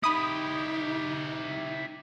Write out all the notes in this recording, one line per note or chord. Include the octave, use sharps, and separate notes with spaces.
D#4 E4 G4 B5 D#6